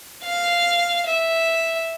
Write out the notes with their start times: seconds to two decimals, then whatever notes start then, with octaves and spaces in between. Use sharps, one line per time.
0.23 F5
1.06 E5